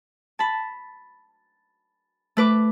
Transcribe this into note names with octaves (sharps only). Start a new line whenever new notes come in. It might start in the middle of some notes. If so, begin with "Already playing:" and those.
A5 B5
A3 B4 D6